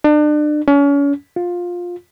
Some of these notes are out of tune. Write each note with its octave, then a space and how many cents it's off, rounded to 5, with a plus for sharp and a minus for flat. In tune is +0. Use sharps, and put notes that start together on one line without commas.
D4 +35
C#4 +35
F4 +15